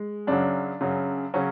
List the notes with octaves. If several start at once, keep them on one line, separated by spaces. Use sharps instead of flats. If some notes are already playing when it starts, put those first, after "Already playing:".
Already playing: G#3
F#2 C#3 F#3 D4
F#2 C#3 F#3
C#3 F#3 C#4